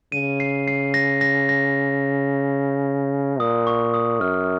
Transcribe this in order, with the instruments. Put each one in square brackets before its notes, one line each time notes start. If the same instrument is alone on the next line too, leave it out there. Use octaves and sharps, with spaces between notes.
[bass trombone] C#3 [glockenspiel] D#7
[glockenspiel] C7
C7
A#6
A#6
A#6
[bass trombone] A#2 [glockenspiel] D#6
[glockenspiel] C#6
D#6
[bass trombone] F#2 [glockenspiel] F6